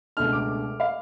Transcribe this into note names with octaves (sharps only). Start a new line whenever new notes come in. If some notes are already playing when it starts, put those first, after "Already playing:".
C#2 B2 A3 D4 F6
D6
F5